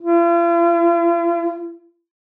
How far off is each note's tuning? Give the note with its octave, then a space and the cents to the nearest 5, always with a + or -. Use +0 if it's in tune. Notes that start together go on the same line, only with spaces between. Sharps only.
F4 -45